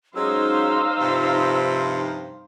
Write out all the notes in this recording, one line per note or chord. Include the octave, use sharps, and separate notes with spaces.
F#3 G#3 C#4 D#4 C5 F5 E6
G2 C3 F3